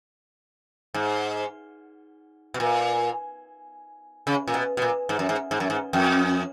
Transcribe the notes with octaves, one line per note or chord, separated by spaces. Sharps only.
G#2
B2
A#2
C#3
A#2
B2
B2
A#2
G#2
F#2
G#2
G#2
F#2
G#2
F2